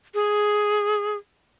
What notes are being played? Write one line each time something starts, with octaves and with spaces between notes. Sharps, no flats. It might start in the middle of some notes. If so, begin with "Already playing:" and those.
G#4